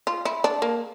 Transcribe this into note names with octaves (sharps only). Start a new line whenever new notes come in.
F4
E4
D4
A#3